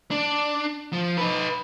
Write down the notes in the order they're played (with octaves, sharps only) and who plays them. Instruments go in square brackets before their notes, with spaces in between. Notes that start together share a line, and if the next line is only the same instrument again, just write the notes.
[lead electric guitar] D4
F3
D#4 B4